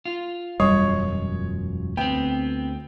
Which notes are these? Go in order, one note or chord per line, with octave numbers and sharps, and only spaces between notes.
F4
E1 F#2 G3 C#5
D2 B3 C4 G5